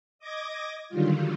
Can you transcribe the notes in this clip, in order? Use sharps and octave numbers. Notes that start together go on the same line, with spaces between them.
D#5 D6 G#6 A#6
D3 D#3 F#3 G3 F4